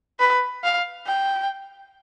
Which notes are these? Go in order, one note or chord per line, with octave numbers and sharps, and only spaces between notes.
B4
F5
G5